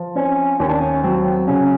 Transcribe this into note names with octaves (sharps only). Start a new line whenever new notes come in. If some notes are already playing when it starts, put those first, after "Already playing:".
Already playing: F3
C4 C#4
D#2 C#4
D4
C#4
F#3 C4
C#3 C#4